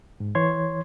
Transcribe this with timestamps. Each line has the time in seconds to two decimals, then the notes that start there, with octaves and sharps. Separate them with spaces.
0.20 G#2
0.35 E3 C#5 C6 G#6